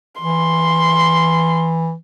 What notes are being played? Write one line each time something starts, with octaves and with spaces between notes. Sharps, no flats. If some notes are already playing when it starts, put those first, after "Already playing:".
E3 C6